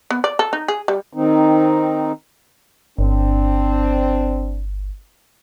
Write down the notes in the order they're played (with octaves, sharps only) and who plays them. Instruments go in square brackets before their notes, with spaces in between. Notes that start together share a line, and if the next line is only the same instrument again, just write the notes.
[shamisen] B3
D5
A4
D#4
G#4
G3
[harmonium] D#3 C4 D#4
[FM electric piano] G1 [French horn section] C4 D4